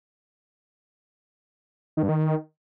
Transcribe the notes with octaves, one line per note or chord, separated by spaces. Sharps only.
D#3
G2
D#3